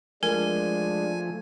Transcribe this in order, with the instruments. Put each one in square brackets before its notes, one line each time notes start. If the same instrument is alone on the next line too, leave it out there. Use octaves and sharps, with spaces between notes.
[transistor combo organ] F3 A3 [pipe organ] G#3 D4 [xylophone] A#4 [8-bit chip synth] G#5